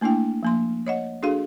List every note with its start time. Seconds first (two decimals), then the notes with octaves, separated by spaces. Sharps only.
0.01 A3 A#3 D4 E4 G5
0.43 F3 A#3 C6
0.87 C#5 D#5 F#5
1.23 D4 F#4 G#4 A4 F5 C6